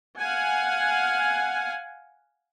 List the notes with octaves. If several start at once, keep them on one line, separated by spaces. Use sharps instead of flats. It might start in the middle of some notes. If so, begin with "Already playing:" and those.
F5 F#5 G#5